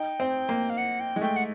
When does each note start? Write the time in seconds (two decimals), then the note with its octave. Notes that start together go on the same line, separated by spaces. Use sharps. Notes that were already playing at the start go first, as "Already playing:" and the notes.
Already playing: D#4 G5
0.20 C4
0.49 A#3
0.69 F5
0.77 F#5
0.99 G5
1.16 G#3
1.21 A3 G5
1.36 F#5